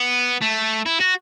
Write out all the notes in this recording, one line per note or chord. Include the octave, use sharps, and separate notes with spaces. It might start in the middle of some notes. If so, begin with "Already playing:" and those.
Already playing: B3
A3
E4
F#4